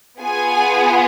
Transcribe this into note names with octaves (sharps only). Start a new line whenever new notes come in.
B3 F4 G#4 G#5